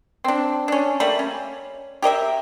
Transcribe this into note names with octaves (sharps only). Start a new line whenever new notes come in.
C4 D4
C#4 D4
G3 A3 A#3 B5
C#4
G4 A#4 D#5 E5